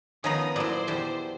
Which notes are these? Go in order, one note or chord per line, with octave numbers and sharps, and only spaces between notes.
D#3 F3 B3 C#4 A#5 D#6
A#2 F#3 E4 C5 D5
E2 G4 A5